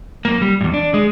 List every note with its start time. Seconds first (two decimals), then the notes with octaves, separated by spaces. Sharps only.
0.25 F#2 A#3
0.42 G3
0.61 E2 G2
0.74 D4
0.94 G#3